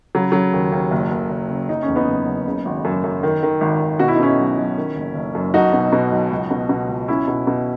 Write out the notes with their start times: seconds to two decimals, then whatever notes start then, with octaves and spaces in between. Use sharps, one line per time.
0.15 C#3 F#3
0.32 C#3 F#3
0.53 D#2
0.72 D#2
0.91 F#1
1.11 F#1
1.30 F#1
1.49 C#3
1.69 F#1 D#4
1.83 C#4
1.88 E2
1.96 B3 D#4
2.08 F#1
2.27 F#1
2.46 C#3
2.65 G#1
2.85 F#2
3.04 F#2
3.23 D#3
3.43 D#3
3.61 G#1
3.80 G#1
3.99 B2 F#4
4.08 E4
4.16 D#4
4.19 B2 C#4 E4
4.39 B1
4.58 B1
4.77 D#3
4.96 F#1
5.15 F#1
5.35 F#2
5.54 B1 D#4 F#4
5.73 B2
5.93 B2
6.12 B1
6.31 C#2
6.50 B2
6.69 B2
6.88 C#2
7.08 B1 C#4 E4
7.28 B2
7.47 B2